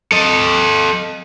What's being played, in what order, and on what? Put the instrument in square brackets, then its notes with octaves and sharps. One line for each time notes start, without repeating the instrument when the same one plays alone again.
[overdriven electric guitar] A4 D#5